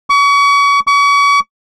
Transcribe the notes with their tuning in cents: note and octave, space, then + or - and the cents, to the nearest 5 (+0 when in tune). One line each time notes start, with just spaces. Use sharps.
C#6 +35
C#6 +40